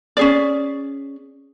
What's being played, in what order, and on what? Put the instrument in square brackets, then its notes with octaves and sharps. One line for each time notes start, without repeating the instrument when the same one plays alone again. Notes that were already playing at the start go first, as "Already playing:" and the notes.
[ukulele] C#4 G#4 D5